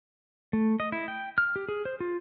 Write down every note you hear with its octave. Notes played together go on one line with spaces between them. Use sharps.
A3
D#5
E4
G5
F6
G4
G#4
C5
F4